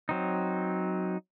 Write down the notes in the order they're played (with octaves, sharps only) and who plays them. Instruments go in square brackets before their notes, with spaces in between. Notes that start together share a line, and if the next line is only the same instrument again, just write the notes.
[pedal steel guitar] F#3 C4 D#4